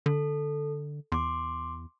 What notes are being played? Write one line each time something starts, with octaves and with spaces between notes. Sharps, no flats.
D3 A4
E2 C6 D6